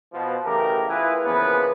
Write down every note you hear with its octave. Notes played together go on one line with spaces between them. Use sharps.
B2 F3
C#3 E3 A3 G4 A#4
E4 F4 G#4 B4
C#3 E3 F3 A#3 B3 B4